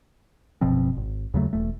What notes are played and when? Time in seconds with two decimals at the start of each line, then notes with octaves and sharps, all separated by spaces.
0.61 F#1 B2 F3 C4
0.97 G#1
1.34 D#2 C#3 F#3 A3
1.53 E1 A3